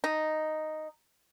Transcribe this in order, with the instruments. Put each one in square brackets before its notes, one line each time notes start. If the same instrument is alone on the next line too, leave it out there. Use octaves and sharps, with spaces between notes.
[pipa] D#4